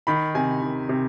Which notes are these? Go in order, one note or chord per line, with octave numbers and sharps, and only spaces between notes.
D#3 B5
C3 G#5
D#3
C3